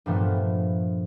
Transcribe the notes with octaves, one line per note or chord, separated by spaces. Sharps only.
G2 A#2 F3 A3 B3